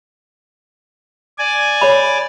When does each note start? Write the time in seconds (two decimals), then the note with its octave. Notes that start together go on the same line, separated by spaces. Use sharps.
1.38 D5 G#5
1.81 C#5 B5